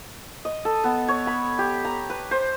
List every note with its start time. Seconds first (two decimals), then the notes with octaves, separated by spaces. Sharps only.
0.45 D#5
0.65 A4
0.84 B3
1.08 C#5
1.27 B5
1.59 G4
1.85 A#5
2.10 B4
2.31 C5